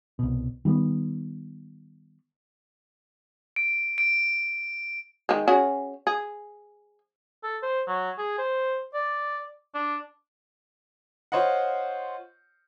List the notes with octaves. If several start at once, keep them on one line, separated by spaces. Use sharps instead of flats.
C2 B2
D#3 G3 A3 B3
D7
D7
D#3 G#3
C#4 F#4 G#4
G#4
A4
C5
F#3
G#4
C5
D5
D4
F4 C5 C#5 D#5 F#5